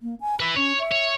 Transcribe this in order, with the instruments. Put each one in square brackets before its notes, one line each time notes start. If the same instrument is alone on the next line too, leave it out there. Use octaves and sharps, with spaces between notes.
[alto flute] A#3
G#5
[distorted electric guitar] B4 E5 [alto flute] B5
[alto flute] C#4 [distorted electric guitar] C#5
[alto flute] E5
[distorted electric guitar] C#5